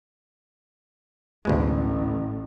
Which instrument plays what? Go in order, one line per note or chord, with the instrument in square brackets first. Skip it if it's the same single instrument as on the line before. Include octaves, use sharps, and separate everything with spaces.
[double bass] A1 [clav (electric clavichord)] D2 B2 G#3